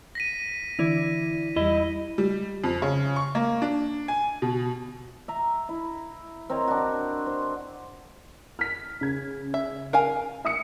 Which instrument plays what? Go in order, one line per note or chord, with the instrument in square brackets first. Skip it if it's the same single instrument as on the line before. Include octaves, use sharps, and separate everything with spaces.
[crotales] A#6 B6 D#7
[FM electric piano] D3 E3 D5 [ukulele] E4
[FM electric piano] E2 G3 [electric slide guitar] E4 D#5
[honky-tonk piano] G3
F2
C#3
C#6
A#3
D4
G#5
B2
[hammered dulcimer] E5 A#5
E4
C4 A#4 C#5 D#5
D4 F#4
C5
[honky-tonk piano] F6 B6
C#3 G#6
[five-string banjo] E5
A#4 F5 G#5
[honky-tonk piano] E5 D#6 C#7